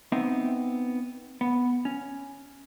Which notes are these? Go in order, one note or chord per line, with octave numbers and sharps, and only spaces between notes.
B3 C4 D#4 E5
B3
C#4